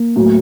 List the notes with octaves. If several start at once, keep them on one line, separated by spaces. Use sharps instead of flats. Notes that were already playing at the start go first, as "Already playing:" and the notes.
Already playing: A#3
A2 F#3